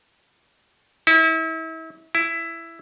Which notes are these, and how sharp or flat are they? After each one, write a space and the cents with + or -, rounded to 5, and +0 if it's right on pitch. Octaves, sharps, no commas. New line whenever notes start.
E4 -35
E4 +10